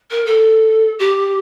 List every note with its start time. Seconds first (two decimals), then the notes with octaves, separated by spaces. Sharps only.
0.11 A#4
0.26 A4
0.99 G4